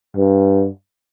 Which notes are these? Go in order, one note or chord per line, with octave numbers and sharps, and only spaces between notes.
G2